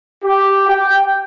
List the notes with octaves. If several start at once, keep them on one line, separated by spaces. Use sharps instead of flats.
G4
G5